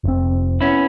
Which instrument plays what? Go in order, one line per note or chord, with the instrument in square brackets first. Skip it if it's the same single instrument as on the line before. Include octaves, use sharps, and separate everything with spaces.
[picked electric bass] F1 C4
[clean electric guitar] B3 C#4 E4